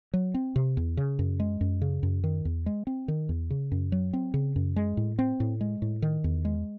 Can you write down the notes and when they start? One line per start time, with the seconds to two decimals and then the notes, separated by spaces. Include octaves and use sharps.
0.14 F#3
0.34 C4
0.56 C3
0.77 E2
0.97 C#3
1.19 F#2
1.40 G#3
1.61 F#2
1.82 C#3
2.03 F#2
2.24 D#3
2.45 E2
2.66 G#3
2.87 C4
3.08 D#3
3.29 E2
3.50 C#3
3.72 F#2
3.92 F#3
4.13 C4
4.34 C#3
4.56 F#2
4.76 G#3
4.97 A2
5.19 C4
5.40 A2
5.61 G#3
5.82 A2
6.02 D#3
6.24 E2
6.45 G#3